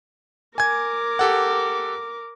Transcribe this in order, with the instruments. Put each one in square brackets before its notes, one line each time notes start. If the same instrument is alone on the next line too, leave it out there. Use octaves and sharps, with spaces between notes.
[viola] A#4 D6 [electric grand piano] G#5 G#6
[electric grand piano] G4 A4 F#5